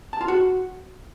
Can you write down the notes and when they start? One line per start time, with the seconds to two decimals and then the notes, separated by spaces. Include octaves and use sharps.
0.13 A5
0.21 F4
0.28 F#4